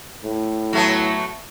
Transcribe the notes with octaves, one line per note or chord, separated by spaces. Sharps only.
A2
F#3 A3 B3